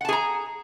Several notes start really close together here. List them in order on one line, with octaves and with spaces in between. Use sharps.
F#5 A5 G#4 A#5